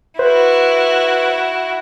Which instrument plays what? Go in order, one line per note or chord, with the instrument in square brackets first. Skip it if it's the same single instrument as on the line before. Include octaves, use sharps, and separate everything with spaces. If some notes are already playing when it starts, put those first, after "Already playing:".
[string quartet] E4 F#4 [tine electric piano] B4 C5